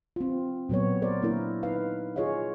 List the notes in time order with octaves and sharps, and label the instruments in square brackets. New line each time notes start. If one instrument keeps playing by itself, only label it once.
[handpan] C4 F4
A#2 F#3 B3 C#5
A#4 C5 D5
A#3 D4 E4 A#4
D#4 B4 F5
F4 G#4 C#5 D#5 F5